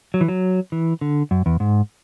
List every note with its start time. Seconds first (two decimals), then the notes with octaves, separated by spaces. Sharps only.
0.14 F#3
0.21 E3
0.28 F#3
0.72 E3
1.01 D3
1.31 F#2
1.46 E2
1.60 G#2